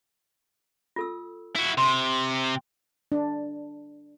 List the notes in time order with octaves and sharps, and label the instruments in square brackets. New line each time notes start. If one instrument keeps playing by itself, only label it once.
[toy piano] F4 A4 E6
[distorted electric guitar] E4 F#4
[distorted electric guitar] C3 [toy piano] C6
[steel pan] D4